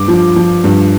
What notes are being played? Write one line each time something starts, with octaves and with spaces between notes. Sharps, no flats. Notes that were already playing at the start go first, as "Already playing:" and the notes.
Already playing: G2 D6
F3
F3
G2